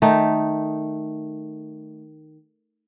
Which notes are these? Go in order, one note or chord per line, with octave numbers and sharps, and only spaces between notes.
D#3 A3 D#4